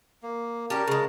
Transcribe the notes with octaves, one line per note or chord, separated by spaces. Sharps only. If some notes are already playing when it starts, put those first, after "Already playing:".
A#3
G3 C#4 G4 A#4 A5
C#3 G#3